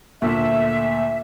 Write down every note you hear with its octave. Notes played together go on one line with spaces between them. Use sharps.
D2 A#2 A3 E5